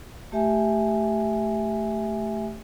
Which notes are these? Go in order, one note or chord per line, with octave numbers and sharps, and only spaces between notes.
A3 G4 E5 G#5